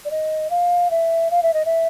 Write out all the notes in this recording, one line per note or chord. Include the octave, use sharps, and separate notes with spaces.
D5
D#5
F5
E5
F5
E5
D#5
E5